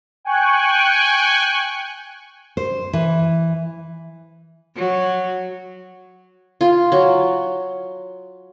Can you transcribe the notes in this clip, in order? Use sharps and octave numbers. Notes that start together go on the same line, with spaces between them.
G5 G#5 C#6 F#6
C5
E3
F#3
F4
F#3